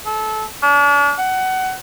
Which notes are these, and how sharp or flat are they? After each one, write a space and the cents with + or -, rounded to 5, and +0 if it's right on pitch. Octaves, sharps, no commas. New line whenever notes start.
A4 -25
D4 -40
F#5 +20